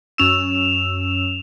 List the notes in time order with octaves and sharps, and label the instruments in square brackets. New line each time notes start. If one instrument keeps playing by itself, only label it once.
[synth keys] F#2 C#4 E6 [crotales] E7 F7